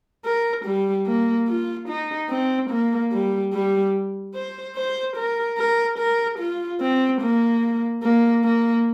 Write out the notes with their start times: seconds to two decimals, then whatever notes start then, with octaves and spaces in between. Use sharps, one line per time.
0.25 A#4
0.65 G3
1.06 A#3
1.48 F4
1.88 D#4
2.29 C4
2.70 A#3
3.12 G3
3.53 G3
4.34 C5
4.76 C5
5.16 A#4
5.58 A#4
5.98 A#4
6.39 F4
6.81 C4
7.22 A#3
8.03 A#3
8.44 A#3